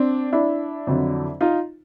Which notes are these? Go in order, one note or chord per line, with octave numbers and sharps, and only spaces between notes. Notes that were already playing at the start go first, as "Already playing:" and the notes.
Already playing: C4 D4
D4 E4
F2 D3 F#3
D#4 F4